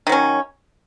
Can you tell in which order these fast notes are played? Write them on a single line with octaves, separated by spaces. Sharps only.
D#3 F#3 C#4